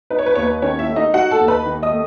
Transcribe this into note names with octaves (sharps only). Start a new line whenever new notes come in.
D#4 B4
C#5
B4
D#2 C#5
B4
D#3 C#4 C#5
E4 E5
A3
D#4 D#5
D#4 F#4 F#5
A4 A5
D#2
B4 B5
D#3
D#5 D#6
A3